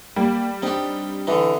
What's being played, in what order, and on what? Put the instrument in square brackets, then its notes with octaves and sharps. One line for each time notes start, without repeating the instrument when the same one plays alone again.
[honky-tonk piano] G3 [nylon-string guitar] A#3
[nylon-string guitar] C4 D4 [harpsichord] D#4 G4
[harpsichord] D3 D#4 [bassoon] E3